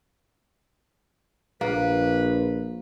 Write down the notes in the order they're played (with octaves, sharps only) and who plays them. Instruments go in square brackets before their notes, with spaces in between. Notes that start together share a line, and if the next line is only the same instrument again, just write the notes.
[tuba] A#1 [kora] A#3 [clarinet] B4